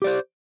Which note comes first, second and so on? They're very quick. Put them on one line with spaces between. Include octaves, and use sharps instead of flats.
G4 D5 C5